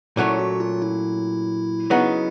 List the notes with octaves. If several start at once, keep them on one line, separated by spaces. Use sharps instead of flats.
A#2 F#3 A3 C#4 E4
F#4
F4
E4
C#3 F#3 B3 D#4